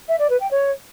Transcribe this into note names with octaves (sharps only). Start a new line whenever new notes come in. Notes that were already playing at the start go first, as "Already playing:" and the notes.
E5
D5
B4
G5
C#5